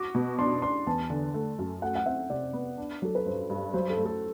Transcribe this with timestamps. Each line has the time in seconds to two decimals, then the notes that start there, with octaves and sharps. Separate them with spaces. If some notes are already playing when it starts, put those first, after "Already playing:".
Already playing: F#4 D6
0.15 B2
0.39 D4 C6
0.62 D4 C6
0.87 E2 A5
1.10 D3
1.34 A3
1.59 F#2
1.82 A3 F#5
1.95 F#5
2.06 C4 E5
2.30 C3 D5
2.53 B3
2.78 D4
3.02 F#3 A4
3.15 B4
3.25 G2 C5
3.50 G2
3.73 F#3 C5
3.90 A4
3.97 A3
4.05 A4